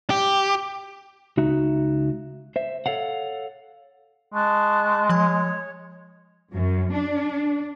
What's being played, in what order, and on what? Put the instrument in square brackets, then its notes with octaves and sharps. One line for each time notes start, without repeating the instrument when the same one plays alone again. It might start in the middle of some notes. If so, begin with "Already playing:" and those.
[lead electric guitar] G4
[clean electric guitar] C#2 D#4 F#4 E5
C5 E5
A4 C#5 F5 F#5
[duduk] G#3 [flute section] A5 C#6 F#6
[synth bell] F3 G#5 [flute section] C#5
[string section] F#2
D4